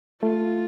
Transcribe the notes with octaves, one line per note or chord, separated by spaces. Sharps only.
A3 F4